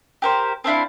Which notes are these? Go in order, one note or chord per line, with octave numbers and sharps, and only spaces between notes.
G4 A#4 C5
C4 D4 E4 F5